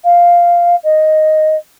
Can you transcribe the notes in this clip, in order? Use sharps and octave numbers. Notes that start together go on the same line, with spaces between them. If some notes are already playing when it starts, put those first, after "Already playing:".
F5
D#5